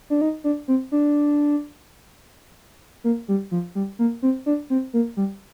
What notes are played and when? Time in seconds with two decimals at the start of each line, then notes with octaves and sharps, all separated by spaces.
0.10 D4
0.21 D#4
0.44 D4
0.68 C4
0.92 D4
3.04 A#3
3.28 G3
3.51 F3
3.75 G3
3.99 A#3
4.22 C4
4.46 D4
4.70 C4
4.93 A#3
5.17 G3